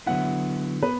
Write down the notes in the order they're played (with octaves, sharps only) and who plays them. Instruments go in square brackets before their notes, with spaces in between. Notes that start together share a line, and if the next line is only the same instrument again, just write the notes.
[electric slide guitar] D3 F#3 B3 E4 [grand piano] F#5
[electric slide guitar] B3 [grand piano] B4